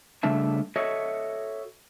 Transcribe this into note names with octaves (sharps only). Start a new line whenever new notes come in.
C#3 G3 A3 D4 E5 A5
F#4 A4 C#5 D#5 E5